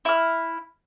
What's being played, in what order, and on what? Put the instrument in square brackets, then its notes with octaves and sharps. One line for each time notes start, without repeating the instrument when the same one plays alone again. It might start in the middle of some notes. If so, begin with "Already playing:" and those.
[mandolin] E4 F6